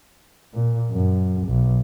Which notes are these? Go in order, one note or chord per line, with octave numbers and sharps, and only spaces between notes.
A#2
F#2
B1